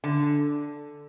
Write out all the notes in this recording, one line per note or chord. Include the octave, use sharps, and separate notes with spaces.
D3